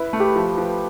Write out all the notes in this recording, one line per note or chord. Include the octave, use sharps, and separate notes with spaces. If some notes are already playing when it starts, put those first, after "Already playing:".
Already playing: E4 B4
A3
G4
F3
F3